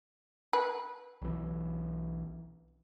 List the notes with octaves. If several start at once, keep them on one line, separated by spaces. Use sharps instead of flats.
B4
B1 E3